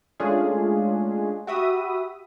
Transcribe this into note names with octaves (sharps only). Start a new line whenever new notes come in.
G#3 A3 C#4 D4 F4 G#4
F#4 G4 E5 B5 D#6